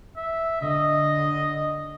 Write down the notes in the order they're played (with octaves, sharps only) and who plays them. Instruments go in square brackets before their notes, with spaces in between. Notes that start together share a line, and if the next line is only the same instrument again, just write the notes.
[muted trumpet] E5
[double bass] D3 [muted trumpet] D#5